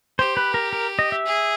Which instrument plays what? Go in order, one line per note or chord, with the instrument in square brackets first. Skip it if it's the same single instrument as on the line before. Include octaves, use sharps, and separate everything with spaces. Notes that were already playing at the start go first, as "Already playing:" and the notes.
[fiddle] G4 [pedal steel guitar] C5
[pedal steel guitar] B4
A#4
A#4
D#5
E5
[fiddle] G#4